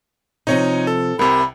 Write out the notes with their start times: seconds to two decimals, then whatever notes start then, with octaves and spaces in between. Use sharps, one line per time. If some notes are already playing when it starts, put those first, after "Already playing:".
0.47 C3 F3 D#4 C#5 D#5
0.87 A4
1.19 C2 C3 A#4 B5